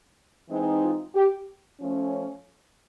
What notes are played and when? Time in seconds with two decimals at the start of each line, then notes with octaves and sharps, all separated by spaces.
0.49 E3 G#3 C4 D#4
0.82 F4
1.15 G4
1.80 F3 A3 C#4